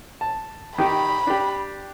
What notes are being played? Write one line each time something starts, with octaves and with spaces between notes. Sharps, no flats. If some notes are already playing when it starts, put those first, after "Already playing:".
A5
D#3 G4 B5
D4 G4